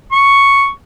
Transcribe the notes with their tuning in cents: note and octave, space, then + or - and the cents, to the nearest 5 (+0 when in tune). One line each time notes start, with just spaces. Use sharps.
C#6 +0